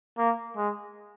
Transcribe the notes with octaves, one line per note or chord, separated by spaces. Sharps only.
A#3
G#3